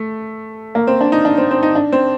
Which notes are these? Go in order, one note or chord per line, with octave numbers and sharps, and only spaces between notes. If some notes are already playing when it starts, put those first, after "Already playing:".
Already playing: A3
A#3
C4
D4
D#4
D4
C4
C4
D#4
D4
C4